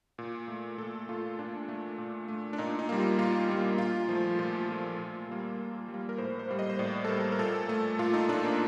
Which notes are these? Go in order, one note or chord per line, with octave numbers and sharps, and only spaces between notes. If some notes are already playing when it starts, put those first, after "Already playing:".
A#2
A3
A#2 A4
A3 F4
A#2 D4
A3
A#2
A3
D4
A#2 D#4
D#4
G3 A#3
F4
A#2 F4
G3 A#3
A#2 F4
F3 A3
A#2 F4
F3 A3
A#2
G3 A#3
A#2
G3
A#3
A#4
A2 C5
C5
G3 A#3
D#5
C5
A2 D5
A4
G3 A#3 A#4
A#4
A#2 A4
A3
A#2 F4
D#4
A3 D4
A#3